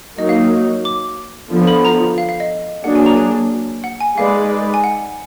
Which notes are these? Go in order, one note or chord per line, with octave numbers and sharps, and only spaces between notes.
F#3 A#3 D#4 D#5
F5
D6
D3 F3 B3
B5
A#5
F5
F5
D#5
F#3 A#3 D4 G#4 F#5
G#5
A#5
G#5
F#5
G#5
G#3 D#4 G#4 B4 D5 F5
G#5
F#5